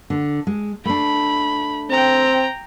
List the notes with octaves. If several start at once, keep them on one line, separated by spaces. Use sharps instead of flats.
D3
G#3
A3 D4 B5
C4 G5 A#5